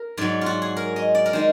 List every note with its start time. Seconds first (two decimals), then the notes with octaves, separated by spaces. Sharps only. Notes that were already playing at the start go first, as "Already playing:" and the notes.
Already playing: A#4
0.17 G#2 F#3 D5
0.41 F4 F#4
0.62 G#4
0.77 A#4
0.96 D#5
1.15 D5
1.26 A#4
1.33 D#3 G#3